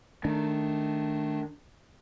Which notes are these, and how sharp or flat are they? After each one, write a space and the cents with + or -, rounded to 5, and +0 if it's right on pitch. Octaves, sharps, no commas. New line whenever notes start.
D#3 -10 A3 -10 D4 +0